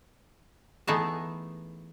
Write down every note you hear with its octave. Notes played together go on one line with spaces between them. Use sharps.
E3 A3 B3 D#4 G#4 A5